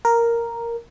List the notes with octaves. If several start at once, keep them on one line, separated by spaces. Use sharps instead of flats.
A#4